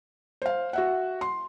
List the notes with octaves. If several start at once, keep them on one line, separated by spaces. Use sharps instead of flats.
C5 F5
F#4 E5 F#5
C6